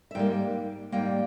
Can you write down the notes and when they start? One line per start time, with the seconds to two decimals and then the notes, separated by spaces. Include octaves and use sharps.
0.11 E5
0.15 G#2 G3 A#3 G5
0.92 G#2 G3 A#3 G5